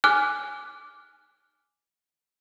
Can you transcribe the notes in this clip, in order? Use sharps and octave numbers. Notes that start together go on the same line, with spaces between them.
G#5 D6 F6 F#6